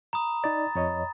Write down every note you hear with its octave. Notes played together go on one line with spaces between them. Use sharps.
A#5 B5 D#6
D#4 D5 A6
F2 C#5 D#5 A6